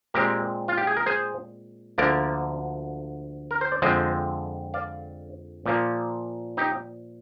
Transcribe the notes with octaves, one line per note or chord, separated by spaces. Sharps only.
A#2 G#3 C4 G4 A#4
F4
G4
G#4
A#4
G#4 C5
D2 D3 F3 A#3 A#4 D5
A#4
C5
D5
F2 D3 F3 G#3 C4 C5 D#5
D5 F5
A#2 F3 A#3
D#4 G4